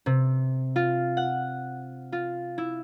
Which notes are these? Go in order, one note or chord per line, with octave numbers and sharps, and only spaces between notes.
C3
F4
F#5
F4
E4